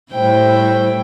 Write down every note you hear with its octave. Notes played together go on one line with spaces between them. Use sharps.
A2 G3 E4 C5 G5